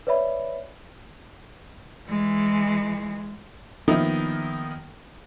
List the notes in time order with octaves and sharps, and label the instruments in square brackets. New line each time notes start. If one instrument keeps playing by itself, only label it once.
[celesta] B4 C#5 D5 E5 B5
[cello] E3 G#3
[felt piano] D#3 F3 A#3 B3 D#4 E4